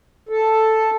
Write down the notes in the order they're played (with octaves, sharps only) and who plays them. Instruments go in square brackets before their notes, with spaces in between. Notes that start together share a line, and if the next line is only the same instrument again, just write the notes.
[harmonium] A4